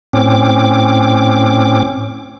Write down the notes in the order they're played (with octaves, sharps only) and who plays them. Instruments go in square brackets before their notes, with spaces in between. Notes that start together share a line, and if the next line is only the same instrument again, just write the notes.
[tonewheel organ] A2 C4 C#4 D6